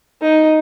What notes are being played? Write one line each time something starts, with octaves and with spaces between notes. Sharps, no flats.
D#4